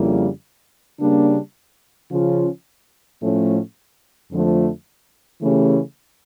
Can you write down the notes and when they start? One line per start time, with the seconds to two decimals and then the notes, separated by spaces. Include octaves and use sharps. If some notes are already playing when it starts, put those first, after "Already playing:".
Already playing: F2 C#3 G3 A#3 E4
1.00 C#3 G3 A#3 D4
2.09 C#3 F3 C#4 F4
3.20 A2 F3 A3 C#4
4.31 F2 D3 F3 A3
5.41 C#3 E3 A3 C#4 G4